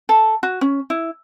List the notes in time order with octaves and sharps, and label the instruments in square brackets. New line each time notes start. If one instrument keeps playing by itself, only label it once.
[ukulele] A4
F#4
C#4
E4